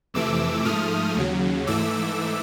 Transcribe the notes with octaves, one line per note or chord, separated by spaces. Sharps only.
F2 C3 E3 A3 D6 E6
G#2 F3 A3 D#6 F6
D#2 C#3 F#3
G#2 E3 A3 D6 E6